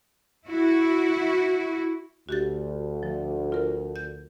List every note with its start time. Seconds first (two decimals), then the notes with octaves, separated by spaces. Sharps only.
0.47 E4 F#4
2.29 D2 F#4 G4 A6
3.03 F3
3.52 F4 A#4
3.96 G6